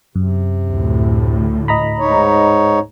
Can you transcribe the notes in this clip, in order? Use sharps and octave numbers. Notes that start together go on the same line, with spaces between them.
F#2 C3
D2 A2
D#5 A#5 B5
G#2 D#4 C#5